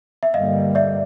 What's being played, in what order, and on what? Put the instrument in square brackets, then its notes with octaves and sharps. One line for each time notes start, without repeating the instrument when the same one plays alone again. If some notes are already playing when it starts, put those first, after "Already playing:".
[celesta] E5
[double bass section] G2 D3 G3 A#3 [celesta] D#5 F5
[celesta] D5 E5